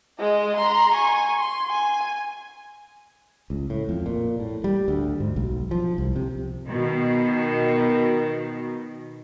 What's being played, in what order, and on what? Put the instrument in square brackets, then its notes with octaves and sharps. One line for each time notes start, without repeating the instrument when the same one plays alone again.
[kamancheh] G#3 D#5
A#5 C6
G#5 C#6
C6
G#5
[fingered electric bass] C#2
A2
F2
A#2
A2
G3
D2
G#2
B1
F3
C2
C3
[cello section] B2 D#3